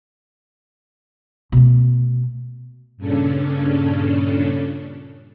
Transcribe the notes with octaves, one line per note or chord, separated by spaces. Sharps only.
B2 A3
G2 A#2 C#3 C#4 D4 A4